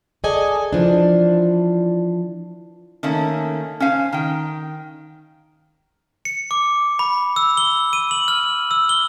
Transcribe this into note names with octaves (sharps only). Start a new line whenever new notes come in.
G#4 A4 D5 D#5 G#5
E3 F3 D4
D#3 A3 A#3 C#4
C#4 C5 F5 G#5
D#3 G5
C#7
D6
B5
E6
G7
D#7
F#7
F6
E6
G7